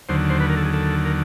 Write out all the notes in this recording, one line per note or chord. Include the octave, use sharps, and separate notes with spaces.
D#2 D3 F#3 C5
C5
B4
A#4
A4
G#4
A4
A#4